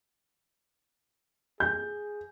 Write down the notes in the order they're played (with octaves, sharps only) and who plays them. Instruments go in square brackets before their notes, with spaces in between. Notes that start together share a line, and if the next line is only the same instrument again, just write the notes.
[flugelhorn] G#4 [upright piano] G6